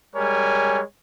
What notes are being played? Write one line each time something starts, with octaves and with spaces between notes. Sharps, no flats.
G3 G#3 A#4 C#5 G#5